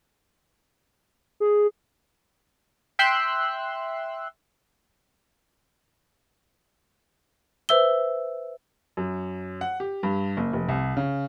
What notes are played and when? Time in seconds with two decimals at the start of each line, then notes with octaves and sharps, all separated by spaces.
1.40 G#4
2.99 E5 G5 C6 E6 F#6
7.69 B4 C5 E5 E6 G7
8.97 F#2
9.61 F#5
9.80 G4
10.03 G2
10.37 F#1
10.53 F1
10.69 C2
10.97 C#3